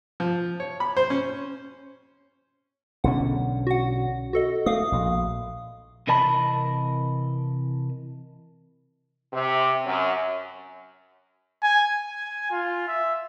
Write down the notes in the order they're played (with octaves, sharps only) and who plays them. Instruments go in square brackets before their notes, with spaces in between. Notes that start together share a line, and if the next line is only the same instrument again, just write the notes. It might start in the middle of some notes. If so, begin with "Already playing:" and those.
[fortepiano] F3
C#5
B5
C5
C#4
[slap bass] B1 D3 C#4 [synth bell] F#5
[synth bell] F#4 F#5
F#4 A4 D#5
[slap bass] A3 [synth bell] F5 D#6
[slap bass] A#1
[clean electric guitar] C3 E3 A#4 D#5 A5 B5
[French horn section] C3
F#2
[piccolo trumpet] G#5
G#5
F4
E5